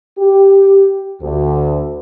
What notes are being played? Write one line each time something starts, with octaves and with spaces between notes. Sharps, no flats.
G4
D2